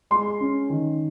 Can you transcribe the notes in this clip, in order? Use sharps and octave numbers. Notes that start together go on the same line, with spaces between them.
G#3 C6
C#4
D#3